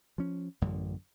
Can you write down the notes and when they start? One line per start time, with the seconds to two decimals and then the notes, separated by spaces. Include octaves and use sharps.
0.18 F3 C#4
0.61 A1 F#2 D3